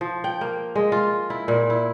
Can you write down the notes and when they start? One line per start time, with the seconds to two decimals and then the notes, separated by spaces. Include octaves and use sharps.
0.01 F3
0.24 G5
0.41 A#3
0.75 G#3
0.92 F4
1.30 E4
1.48 A#2
1.70 E4